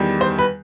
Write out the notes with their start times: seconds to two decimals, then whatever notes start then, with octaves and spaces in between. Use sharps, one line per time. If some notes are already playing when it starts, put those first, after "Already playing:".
Already playing: E2 D#3 G3
0.21 C5
0.39 B4